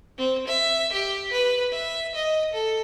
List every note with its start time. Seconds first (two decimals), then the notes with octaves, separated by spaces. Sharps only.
0.18 C4
0.47 E5
0.92 G4
1.32 B4
1.72 E5
2.15 D#5
2.53 A4